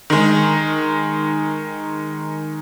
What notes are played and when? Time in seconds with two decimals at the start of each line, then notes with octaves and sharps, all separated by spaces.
0.10 D#3 G#3